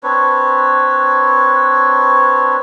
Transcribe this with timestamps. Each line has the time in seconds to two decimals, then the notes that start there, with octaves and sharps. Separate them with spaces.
0.03 C4 D4 B4 C#5